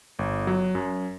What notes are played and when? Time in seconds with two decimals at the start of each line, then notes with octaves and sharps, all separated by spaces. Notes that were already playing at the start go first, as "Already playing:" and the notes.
0.19 G1
0.47 F#3
0.75 F#2